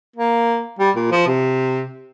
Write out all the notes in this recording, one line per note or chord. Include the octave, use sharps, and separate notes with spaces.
A#3
G3
A#2
F3
C3